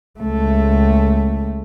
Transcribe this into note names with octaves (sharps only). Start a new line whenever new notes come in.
C#2 A3